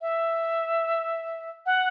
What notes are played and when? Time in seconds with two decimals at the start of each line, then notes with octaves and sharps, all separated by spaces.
0.01 E5
1.66 F#5